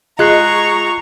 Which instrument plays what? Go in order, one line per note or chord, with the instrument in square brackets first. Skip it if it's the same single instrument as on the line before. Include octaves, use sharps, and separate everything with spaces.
[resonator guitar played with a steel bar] G#3 [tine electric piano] F4 F#6 C7 [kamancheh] A#5 C#6